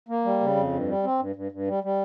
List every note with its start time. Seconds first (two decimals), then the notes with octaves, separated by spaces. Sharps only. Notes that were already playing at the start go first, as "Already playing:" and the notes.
0.08 A#3
0.25 G3
0.40 C#3
0.56 F2
0.72 G2
0.88 G3
1.03 C4
1.19 G2
1.36 G2
1.52 G2
1.67 G3
1.84 G3